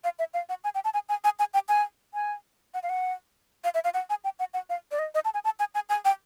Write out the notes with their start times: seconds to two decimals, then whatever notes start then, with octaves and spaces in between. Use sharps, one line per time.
0.04 F5
0.19 E5
0.34 F5
0.49 F#5
0.64 G#5
0.75 G5
0.85 A5
0.94 G#5
1.09 G#5
1.24 G#5
1.39 G#5
1.54 G5
1.69 G#5
2.14 G#5
2.74 F#5
2.83 F5
2.89 F#5
3.64 F5
3.74 E5
3.84 F5
3.94 F#5
4.10 G#5
4.24 G5
4.39 F#5
4.54 F#5
4.70 F5
4.91 D5
4.99 D#5
5.15 D#5
5.25 A5
5.34 G#5
5.45 A5
5.60 G#5
5.75 G#5
5.89 G#5
6.05 G5